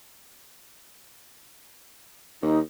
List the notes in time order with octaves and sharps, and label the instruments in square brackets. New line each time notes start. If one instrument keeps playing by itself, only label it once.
[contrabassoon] D#2 [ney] D#4